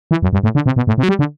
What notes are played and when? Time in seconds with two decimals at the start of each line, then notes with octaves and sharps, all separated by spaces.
0.11 E3
0.22 F#2
0.33 G2
0.43 A2
0.55 D3
0.66 C3
0.76 B2
0.87 A2
0.98 C3
1.03 F#3
1.09 G3
1.19 D3